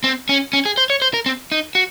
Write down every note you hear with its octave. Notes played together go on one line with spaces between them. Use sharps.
C4
C#4
C#4
G#4
C5
C#5
C5
A#4
C4
D#4
F#4